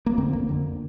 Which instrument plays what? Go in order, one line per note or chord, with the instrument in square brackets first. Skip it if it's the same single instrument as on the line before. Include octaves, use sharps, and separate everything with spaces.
[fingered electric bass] A#3
F2 D3 C4
A#3
F2 D3